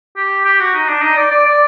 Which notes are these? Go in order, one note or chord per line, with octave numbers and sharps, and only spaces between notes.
G4
G4
F#4
D#4
D4
D#4
D5
D5
D5